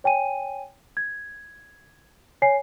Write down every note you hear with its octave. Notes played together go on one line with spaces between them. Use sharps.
C#5 G5 G#5 D#7
G#6
C#5 G#5 C7